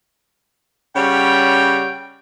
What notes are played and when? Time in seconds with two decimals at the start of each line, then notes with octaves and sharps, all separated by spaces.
0.96 C#3 G3 C#5 F#5 G5